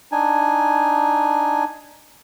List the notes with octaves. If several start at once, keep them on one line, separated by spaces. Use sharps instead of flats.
D4 D#4 G#5